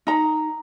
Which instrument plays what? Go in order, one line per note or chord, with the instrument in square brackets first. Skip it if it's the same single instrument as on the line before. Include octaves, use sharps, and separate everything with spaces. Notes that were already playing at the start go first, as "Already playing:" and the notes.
[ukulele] D#4 A#5